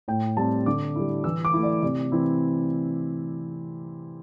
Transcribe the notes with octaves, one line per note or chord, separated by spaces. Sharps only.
A2 G5
G3 C4 A5
D3 D6
G3 E4
E3 E6
D6
A3 E4
D5
C3 D5
E3 C4 E4